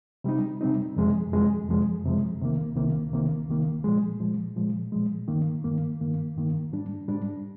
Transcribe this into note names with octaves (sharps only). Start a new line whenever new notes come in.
C3 G3 C4 D#4
C3 G3 C4 D#4
F2 C3 F3 G#3
F2 C3 F3 G#3
F2 C3 F3 G#3
F2 C3 F3 G#3
C2 C3 D#3 A#3
C2 C3 D#3 A#3
C2 C3 D#3 A#3
C2 C3 D#3 A#3
A#2 F3 G#3
A#2 F3 G#3
A#2 F3 G#3
A#2 F3 G#3
G2 D#3 A#3
G2 D#3 A#3
G2 D#3 A#3
G2 D#3 A#3
G#2 G3 D4
G#2 G3 D4